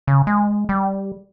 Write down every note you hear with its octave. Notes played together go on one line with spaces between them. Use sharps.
C#3
G#3
G3